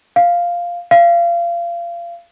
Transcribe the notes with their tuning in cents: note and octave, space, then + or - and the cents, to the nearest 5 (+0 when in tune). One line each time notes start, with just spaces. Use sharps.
F5 -5
F5 -25